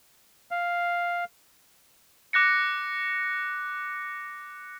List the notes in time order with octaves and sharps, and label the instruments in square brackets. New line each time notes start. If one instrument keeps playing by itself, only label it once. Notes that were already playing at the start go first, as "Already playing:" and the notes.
[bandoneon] F5
[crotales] D6 F#6 A#6 C#7